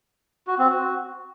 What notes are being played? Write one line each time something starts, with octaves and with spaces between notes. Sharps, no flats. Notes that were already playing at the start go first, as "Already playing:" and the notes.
F#4
C4
F#4